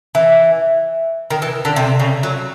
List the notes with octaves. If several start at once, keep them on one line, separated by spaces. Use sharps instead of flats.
E3
D#3
E3
D3
C3
C#3
F#3